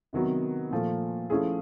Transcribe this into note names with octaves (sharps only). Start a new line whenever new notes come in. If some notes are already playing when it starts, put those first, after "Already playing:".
C3 D#3 F#3 B3
A#2 F3 A3
F3 A3 C#4 E4 G#4